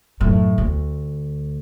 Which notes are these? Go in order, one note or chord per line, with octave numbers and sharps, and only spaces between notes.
F#2 A2
D2